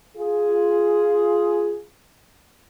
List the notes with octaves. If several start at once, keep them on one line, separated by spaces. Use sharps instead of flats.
F4 G#4